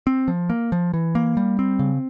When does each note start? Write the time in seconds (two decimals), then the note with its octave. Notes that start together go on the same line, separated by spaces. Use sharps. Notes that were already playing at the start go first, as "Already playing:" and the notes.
0.07 C4
0.28 F3
0.50 A#3
0.72 F3
0.94 E3
1.15 A#3
1.37 G3
1.59 C4
1.79 C#3